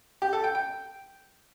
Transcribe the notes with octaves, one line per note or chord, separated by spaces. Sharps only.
G4
A4
G5
G5